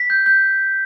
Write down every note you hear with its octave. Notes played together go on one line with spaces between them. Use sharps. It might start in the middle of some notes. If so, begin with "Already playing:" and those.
Already playing: B6
G6
G6